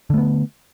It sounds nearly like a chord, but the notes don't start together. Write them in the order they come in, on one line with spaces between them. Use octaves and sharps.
D3 A3 B3